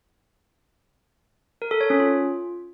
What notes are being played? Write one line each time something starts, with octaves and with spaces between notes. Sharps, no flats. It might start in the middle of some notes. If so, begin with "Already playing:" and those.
A#4
A4
C#5
C#4
F4